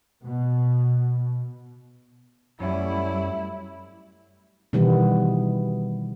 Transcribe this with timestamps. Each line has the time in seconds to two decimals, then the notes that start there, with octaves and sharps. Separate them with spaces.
0.23 B2
2.60 F#2 G3 A3 C#4 E4
4.73 B2 D#3 E3 G3 B3